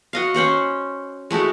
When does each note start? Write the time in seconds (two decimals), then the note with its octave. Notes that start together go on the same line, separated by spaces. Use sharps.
0.13 F#4 D#5 F5
0.34 C#4 C5 C#5 F#5
1.31 G#3 A3 E4 F#4